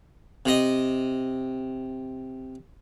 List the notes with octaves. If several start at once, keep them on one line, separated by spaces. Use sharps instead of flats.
C3 D#5